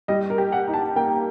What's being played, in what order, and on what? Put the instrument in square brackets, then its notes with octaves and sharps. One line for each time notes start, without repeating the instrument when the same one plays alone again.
[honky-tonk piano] G3 [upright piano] D#5
[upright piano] A#4
[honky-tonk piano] G4
[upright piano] F#5
[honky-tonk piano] D#4
[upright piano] A5
[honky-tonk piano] A#3 [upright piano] G5